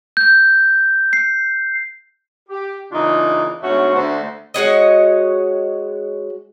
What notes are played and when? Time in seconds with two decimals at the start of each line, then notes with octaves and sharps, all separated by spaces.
0.17 G6
1.13 C7
2.49 G4
2.92 C#3 E3 A#3 D4 D#4 F4
3.62 D2 G#2 B2 A3 C#4 F#4
3.95 D2 A3 C5
4.54 G#3 F#4 C#5 D#5